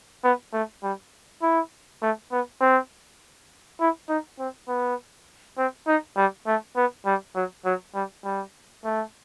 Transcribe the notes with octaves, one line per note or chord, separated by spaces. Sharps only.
B3
A3
G3
E4
A3
B3
C4
E4
D#4
C4
B3
C4
D#4
G3
A3
B3
G3
F#3
F#3
G3
G3
A3